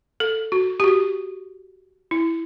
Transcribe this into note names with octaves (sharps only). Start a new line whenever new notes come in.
A4
F#4
G4
F#4
E4